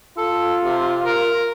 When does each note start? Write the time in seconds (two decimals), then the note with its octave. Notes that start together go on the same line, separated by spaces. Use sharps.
0.18 F4 A4
0.64 C3
1.05 A#4